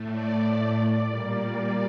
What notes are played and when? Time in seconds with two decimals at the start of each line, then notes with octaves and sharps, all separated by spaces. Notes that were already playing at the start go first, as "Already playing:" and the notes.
Already playing: A2 A3
0.11 D5
1.07 A#2 G3 A#3